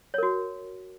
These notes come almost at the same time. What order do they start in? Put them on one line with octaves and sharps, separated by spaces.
C#5 A#4 F#4